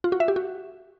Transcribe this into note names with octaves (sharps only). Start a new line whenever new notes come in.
F4
F#4
E5
G4
F#4